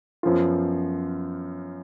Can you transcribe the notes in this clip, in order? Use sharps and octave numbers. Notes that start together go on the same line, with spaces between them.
F#2 F3 B3 F4